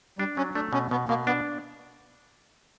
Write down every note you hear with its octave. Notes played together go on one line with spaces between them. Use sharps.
G3 D4
F#3 C#4
A3 D4
B2 C#4
B2 B3
B2 A#3
B3 D4